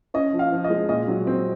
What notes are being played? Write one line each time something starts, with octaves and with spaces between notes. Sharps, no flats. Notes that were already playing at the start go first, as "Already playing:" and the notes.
C#4 D#5
F3
F5
F3
D#5
G#3
A#2 D#5
F#3
C4